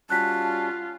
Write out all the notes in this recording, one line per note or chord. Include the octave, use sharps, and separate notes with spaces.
G3 C#4 F4 F#4 A5 F#6 B6